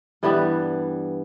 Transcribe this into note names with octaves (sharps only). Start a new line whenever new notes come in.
G2 E3 G3 B3